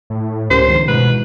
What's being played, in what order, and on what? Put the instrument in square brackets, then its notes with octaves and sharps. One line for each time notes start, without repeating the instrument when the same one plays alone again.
[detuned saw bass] A2
[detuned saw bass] C#2 [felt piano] C#4 G4 A#4 [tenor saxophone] C5
[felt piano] A#1 D#3
[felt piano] G#2 E3 [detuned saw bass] B2 [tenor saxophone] B4